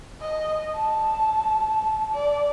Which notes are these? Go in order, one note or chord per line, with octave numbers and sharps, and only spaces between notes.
D#5
A5
D5